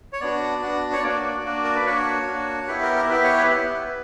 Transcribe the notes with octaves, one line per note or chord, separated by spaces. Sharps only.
C#5
B3 D4 F#4 D5
B3 D4 F#4
C#5
A#3 D4 F#4 D5
A#3 D4 F#4
A#4
B4
A#3 D4 F#4 C#5
A#3 D4 F#4
B3 E4 G4 B4
A#4
A#4
B3 E4 G4 B4
C#5
B4
B3 E4 G4 B4